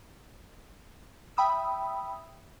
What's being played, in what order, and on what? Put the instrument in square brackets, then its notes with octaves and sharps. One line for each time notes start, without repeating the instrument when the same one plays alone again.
[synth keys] E5 G5 B5 D#6 E6